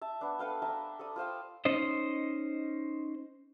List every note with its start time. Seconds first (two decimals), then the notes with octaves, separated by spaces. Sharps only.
0.01 E5 A5
0.21 B3 D4
0.39 A4 B4 F5 G5
0.62 E5 G5 A5 A#5
0.99 A4 D5 D#6
1.16 F4 C5 F5 G5
1.65 C#4 D#4 C5 D#5